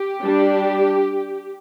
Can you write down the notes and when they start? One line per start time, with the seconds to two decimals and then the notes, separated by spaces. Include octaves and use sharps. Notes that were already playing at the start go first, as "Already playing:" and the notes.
Already playing: G4
0.22 G3 D4